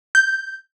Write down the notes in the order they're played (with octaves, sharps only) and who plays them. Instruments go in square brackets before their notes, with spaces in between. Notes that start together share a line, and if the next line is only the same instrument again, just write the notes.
[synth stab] G6